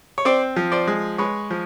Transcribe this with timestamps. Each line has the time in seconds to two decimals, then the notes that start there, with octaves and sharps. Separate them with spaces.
0.18 C#5
0.25 C4 C5 D5
0.56 F3
0.72 C5 D5
0.87 G#3
1.18 G#3 B4 C#5
1.50 F3